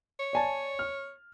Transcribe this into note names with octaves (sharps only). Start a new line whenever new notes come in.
C#5
D5 G#5 A5
F6